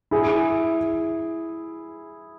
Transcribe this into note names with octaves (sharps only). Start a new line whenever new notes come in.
E4 G#4